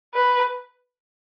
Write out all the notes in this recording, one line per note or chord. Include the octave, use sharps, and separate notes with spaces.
B4